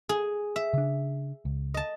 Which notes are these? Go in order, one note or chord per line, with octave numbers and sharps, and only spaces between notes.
G#4
E5
C#3 D4
C#2
D#5 A5